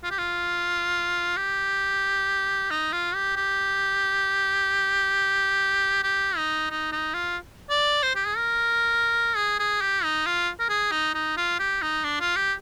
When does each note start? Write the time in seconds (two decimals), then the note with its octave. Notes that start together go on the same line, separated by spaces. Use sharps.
0.04 F4
0.11 G4
0.18 F4
1.37 G4
2.71 D#4
2.93 F4
3.15 G4
3.36 G4
6.03 G4
6.37 D#4
6.70 D#4
6.92 D#4
7.14 F4
7.70 D5
8.03 C5
8.15 G4
8.27 G#4
8.37 A#4
9.36 G#4
9.59 G#4
9.81 G4
10.04 D#4
10.26 F4
10.60 A#4
10.69 G#4
10.92 D#4
11.15 D#4
11.37 F4
11.59 G4
11.82 D#4
12.04 D4
12.20 F4
12.36 G4